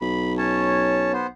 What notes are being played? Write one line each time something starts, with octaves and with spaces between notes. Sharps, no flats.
B1 B5
C#4 C#5 A5
B3 C5